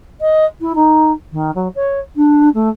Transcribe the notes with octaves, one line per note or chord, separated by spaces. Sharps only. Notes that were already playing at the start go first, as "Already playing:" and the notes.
D#5
E4
D#4
D#3
F#3
C#5
D4
A3